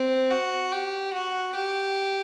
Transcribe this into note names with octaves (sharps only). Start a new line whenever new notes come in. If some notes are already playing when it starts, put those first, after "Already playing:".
Already playing: C4
F#4
G4
F#4
G4